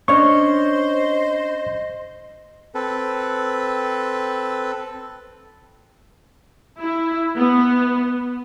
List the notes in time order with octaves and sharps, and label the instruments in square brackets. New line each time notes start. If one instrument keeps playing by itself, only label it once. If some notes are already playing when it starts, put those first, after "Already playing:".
[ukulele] C#4 D4 C#5 [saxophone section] C5 [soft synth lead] D#5 [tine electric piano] C#6
[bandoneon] C4 A4 B4
[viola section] E4
B3